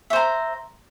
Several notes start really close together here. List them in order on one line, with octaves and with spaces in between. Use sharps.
E5 C5 A#5